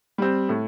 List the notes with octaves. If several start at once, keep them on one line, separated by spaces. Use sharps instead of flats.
G3 C4
A2